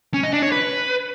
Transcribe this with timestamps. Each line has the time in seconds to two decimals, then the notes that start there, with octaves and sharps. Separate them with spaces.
0.14 C#4
0.23 D#5
0.33 D4
0.42 C#5
0.52 B4